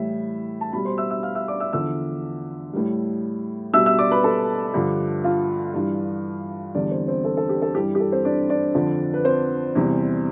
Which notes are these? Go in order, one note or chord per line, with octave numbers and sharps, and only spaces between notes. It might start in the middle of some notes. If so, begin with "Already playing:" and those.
Already playing: A2 E3 G3 E5
A5
B2 G3 B5
C5 C6
E5 E6
E5 E6
F5 F6
E5 E6
D5 D6
E5 E6
E2 D3 F3 E5 E6
A2 G3
B2 G3 E5 E6
E5 E6
D5 D6
B4 B5
A4 A5
G2 D3 F3
F4 F5
G2 E3 G3
E2 D3 G3 D4 D5
C4 C5
C4 C5
A4
A4
G4
A4
G2 E3 G3 G4
G4
A4
C4 C5
D4 D5
D4 D5
F2 D3 F3
B4
C4 C5
E2 C3 E3 G3